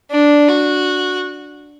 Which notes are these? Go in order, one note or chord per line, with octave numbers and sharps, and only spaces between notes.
D4
F#4